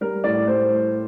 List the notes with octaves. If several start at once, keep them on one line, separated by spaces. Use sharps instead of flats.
G3 A#4
A2 D5
G3 C5
A2